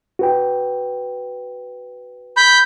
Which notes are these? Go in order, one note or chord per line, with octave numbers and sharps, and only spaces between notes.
F#4 B4 G5
B5 G6